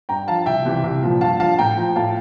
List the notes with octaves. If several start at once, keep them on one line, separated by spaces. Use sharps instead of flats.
G2 G5 A#5
F3 F5 A5
C2 E5 G5
C3 E3 G3
C2
A#2 F3
G2 F5 A5
F3 F5 A5
A2 G5 A#5
F3
A2 F5 A5